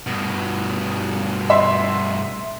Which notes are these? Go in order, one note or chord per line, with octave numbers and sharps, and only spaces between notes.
G2 B2
E5 C6